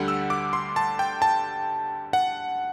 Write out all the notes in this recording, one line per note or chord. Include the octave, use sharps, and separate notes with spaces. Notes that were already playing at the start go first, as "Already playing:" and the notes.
Already playing: D2 D3 G3 F#5
E6
D6
C6
A5
G5
A5
F#5